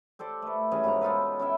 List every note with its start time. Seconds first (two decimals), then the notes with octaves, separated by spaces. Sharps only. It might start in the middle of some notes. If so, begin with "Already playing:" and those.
0.19 G4 A4 C5 D5
0.42 A3 B4
0.71 E3 G3 C#4 G#4
0.84 G#2 B2 A#3 A#5
1.01 D#4 F4 A4 B4
1.39 C#4 E4 E5 G5